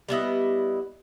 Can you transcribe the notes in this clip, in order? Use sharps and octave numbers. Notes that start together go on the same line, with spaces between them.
G3 B3 E4 D#5